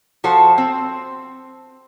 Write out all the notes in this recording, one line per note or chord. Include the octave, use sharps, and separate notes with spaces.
F3 F#4 A4 C5
C4